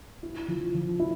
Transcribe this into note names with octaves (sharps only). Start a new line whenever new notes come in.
E4
F3
F3
E4